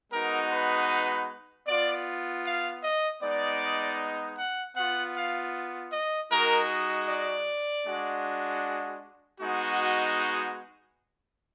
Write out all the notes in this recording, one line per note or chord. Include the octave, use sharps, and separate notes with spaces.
G#3 B3 D#4 F#4 A#4
B4
B3 F4 D5
F5
D#5
G#3 B3 D#4 D5
F#5
B3 F4 F#5
F5
D#5
G#3 D#4 F#4 A#4
D5
G#3 D4 F#4
G#3 B3 D#4 F#4